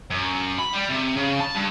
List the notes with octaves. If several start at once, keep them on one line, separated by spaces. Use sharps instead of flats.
F#2
B5
G3
C3
C#3
A5
G2